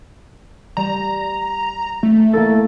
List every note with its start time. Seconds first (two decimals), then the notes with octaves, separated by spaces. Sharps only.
0.77 G3 A#5 E7
2.03 A3
2.33 A#3 E4 A4